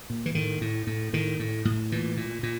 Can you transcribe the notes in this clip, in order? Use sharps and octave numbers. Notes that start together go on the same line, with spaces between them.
A#2
E3
A2 D#3
A2
A2
A2 D#3
A2
A2
A#2 E3
A#2
A#2